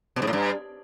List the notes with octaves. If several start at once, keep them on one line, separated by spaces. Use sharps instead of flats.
B2
G#2
A2
G2